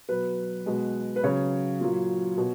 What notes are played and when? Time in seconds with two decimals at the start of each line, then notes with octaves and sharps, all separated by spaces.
0.08 B2 F#3 B4
0.66 B2 G#3
1.16 B4
1.23 C#3 F#3 C#5
1.80 A#2 F#3
2.37 B2